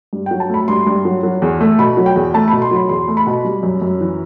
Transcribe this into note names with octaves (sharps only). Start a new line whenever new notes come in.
G2
F#3 G5
A5
A3 B5
G2 C6
G2
F#3
F#3
E2
A3
B2 B5
F#3
G5
E2
A3 A5
B2 B5
C6
F#3 B5
E2 C6
A3
B5
B2
G3
F#2
F#2
E3